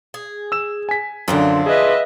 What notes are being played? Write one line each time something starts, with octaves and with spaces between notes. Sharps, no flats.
G#4
E6 E7
G#5 B6
F#2 D3 F3 C4 D4
G#4 B4 D#5 E5